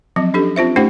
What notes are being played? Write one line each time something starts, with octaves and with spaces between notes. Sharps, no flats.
F3 F#3 C4
C#4 D4 G4 A4
C4 F4 C5 E5
A3 C#4 D#4 G4 C5 F#5